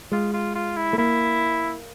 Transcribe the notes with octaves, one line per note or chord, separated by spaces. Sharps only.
G#3 F4
F4
F4
E4
A3
A#3 E4